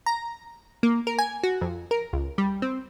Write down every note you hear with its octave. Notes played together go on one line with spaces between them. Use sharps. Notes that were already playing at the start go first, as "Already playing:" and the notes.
A#5
A#3
A#4
G#5
F#4
F2
A#4
C#2
G3
C4